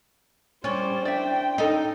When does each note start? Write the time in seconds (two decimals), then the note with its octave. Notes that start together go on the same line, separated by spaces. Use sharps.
0.64 G3 C#4 C5 D5
1.05 D4 D5 E5 G5
1.58 C#4 D#4 A4 D#5